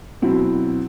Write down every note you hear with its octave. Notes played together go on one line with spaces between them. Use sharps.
B2 F#3 C4 E4